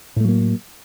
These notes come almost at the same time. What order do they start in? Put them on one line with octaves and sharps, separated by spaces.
A2 A3 F#3 A#3